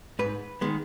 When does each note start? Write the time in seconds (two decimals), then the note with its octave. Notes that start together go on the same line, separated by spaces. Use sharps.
0.19 G#2 B4
0.61 D#3 G#3 B3